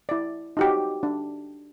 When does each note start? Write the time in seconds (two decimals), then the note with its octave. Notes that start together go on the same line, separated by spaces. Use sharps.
0.09 E4 D5
0.57 D#4 F#4 G4
1.03 D4